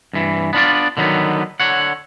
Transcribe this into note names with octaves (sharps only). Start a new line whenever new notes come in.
G2 E3
B3 D4 F4 D5
D3 D#3 F#3 B3
D3 C#5 F#5